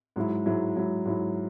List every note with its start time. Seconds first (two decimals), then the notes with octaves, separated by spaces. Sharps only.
0.16 G#2 F#3 E4
0.46 G#2 F#3 E4
0.76 G#2 F#3 E4
1.05 G#2 F#3 E4